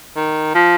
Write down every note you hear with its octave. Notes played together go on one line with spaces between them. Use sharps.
D#3
F3